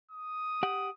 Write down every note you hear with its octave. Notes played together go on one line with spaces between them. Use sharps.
D#6
G4 F#5